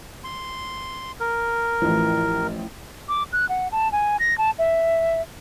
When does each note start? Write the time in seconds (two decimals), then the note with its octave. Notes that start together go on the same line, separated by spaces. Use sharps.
0.24 C6
1.20 A#4
1.82 A1 E3 F3
3.08 D6
3.33 F#6
3.49 F#5
3.72 A5
3.92 G#5
4.20 A#6
4.38 A5
4.59 E5